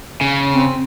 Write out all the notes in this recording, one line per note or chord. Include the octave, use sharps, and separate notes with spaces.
C#3
C4